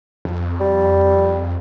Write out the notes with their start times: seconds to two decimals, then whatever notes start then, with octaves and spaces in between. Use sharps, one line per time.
0.25 F2
0.61 G3
1.05 F2